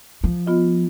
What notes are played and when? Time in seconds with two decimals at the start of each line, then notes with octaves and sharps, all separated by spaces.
0.24 F3
0.47 B3 F4 D#5